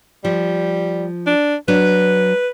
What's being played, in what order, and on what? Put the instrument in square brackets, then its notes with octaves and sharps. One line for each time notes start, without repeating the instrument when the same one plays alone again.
[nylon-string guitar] F3 [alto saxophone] G3
[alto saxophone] D4
[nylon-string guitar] F#3 D4 [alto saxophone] B4